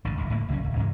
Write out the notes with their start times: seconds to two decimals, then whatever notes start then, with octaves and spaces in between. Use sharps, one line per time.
0.05 A1 G2 D3
0.18 F#1 C#2
0.30 A2 D3 E3 A#3
0.49 F#1 C2 F#3 C#4
0.64 D1
0.77 G2 C3 E3 G#3